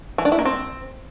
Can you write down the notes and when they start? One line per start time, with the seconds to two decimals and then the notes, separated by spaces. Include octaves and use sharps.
0.18 E3
0.25 D4
0.32 E4
0.39 A#3
0.45 C4